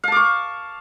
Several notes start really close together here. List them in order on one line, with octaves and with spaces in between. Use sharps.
F5 A5 D6 C#6